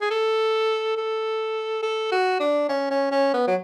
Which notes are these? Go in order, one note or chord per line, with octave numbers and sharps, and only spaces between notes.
G#4
A4
A4
A4
F#4
D4
C#4
C#4
C#4
B3
F#3